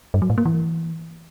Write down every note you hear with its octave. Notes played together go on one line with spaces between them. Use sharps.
G2
F#3
A2
A#3
E3